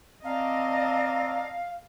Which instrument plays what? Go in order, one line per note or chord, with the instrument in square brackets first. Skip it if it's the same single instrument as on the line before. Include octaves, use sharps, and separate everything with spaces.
[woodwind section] C4 [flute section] D5 A5 A#5 [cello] D#5 [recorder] F5